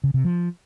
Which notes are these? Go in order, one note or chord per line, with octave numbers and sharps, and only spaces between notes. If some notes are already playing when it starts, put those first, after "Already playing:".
C#3
C3
F3